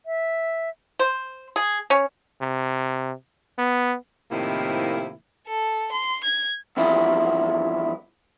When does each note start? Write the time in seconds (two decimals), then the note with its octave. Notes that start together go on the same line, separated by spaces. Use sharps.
0.06 E5
0.99 C5
1.56 G#4
1.90 C#4
2.41 C3
3.58 B3
4.31 A2 C3 D#3 F3 A#3 E4
5.47 A4
5.92 C6
6.24 G#6
6.77 E2 G2 F3 E4